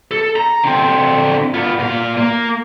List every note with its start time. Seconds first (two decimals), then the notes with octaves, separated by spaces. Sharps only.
0.11 A4
0.36 A#5
0.64 D3 C4
1.54 B3 F4
1.79 A#2 F5
2.17 A#3